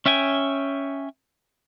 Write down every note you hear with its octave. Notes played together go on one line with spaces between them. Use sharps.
C#4 E5 G5 G#5